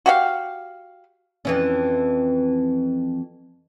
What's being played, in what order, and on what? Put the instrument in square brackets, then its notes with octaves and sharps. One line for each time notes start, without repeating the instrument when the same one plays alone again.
[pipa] F#4 G4 F5
[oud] F2 E3 C#4